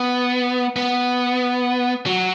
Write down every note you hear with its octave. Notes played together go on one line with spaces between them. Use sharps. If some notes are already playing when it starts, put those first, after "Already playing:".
Already playing: B3
B3
F#3